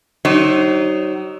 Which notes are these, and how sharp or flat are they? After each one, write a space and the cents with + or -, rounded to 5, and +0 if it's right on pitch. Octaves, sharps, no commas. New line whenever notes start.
F#3 +40 D#4 +0 C5 +40